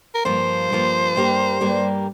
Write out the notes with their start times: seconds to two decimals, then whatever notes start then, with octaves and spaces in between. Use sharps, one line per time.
0.15 A#4
0.25 G2 F3 A#3 F4 C5
0.70 G2 F3 A#3 F4
1.16 G2 G3 A#3 G4 A#4
1.60 G2 G3 A#3 G4 A#4